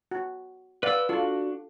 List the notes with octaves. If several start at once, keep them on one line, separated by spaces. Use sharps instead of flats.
F#4
B4 D5 F5 F#5 E6
D4 F4 F#4 A4